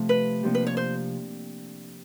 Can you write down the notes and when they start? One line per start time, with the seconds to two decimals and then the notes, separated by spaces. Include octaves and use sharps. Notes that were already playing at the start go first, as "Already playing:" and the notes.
Already playing: C3 F3 A3
0.09 B4
0.43 C3 F3 A#3 D4 G4
0.55 B4
0.67 C#5
0.77 C5